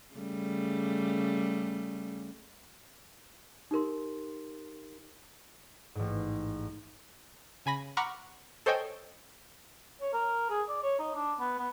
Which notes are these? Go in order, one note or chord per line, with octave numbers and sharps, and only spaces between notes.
C#3 G3 A3
D#4 G4 A#4 C6
A1 G#2
C#3 G#5 B5 A#6
F#5 A#5 B5 C#6 D6 F6
A4 C5 C#5 D#5 G5 G#5
C#5
A#4
G#4
D5
C#5
D#4
D4
B3
B3